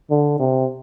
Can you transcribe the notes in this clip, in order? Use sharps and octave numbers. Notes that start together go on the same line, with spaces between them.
D3
C3